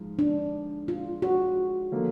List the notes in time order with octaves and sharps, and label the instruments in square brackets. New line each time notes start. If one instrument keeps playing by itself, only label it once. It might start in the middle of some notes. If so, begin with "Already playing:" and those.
Already playing: [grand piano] G#2 F3
[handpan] D4
F4
F#4
[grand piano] D3 F3 A#3